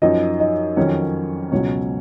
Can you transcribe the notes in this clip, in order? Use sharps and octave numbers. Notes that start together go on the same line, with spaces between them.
F#2 F3 D#4 D#5
D#4 D#5
F2 D#3 F#3 C#4 C#5
C#2 B2 F#3 C#4 C#5